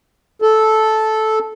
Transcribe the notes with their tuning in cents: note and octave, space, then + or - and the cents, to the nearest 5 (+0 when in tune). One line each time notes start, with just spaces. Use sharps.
A4 -10